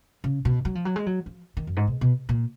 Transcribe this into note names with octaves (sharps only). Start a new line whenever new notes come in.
C#3
B2
F#3
F3
F#3
G#3
F#3
F3
D#3
F#2
G#2
B2
B2
A#2